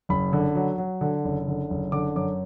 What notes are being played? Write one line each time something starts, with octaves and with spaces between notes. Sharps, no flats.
F#1 B5
D3
F#3
F#3
D3
F#1
D3
F#1
D3 D6
F#2 D6